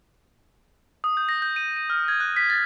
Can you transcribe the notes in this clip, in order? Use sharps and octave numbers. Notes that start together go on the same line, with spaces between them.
D#6
G6
A#6
G6
D#7
D#7
F6
G#6
F#6
B6
A6